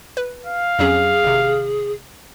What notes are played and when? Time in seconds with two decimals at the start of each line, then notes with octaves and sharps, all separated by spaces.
0.17 B4
0.46 F5
0.79 F2 F#3 C#4 G#4
1.24 G#1 C3